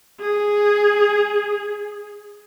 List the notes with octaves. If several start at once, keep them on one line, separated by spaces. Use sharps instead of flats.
G#4